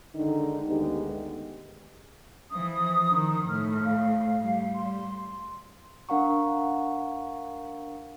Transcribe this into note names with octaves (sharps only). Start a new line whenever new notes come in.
D3 D#3 G#3 D#4
D2 D#3 G#3 B3 G4
E3 F3 D#6
D#3
A2 F6
F5
G3
C6
D4 A#4 F5 F#5 A#5 C#6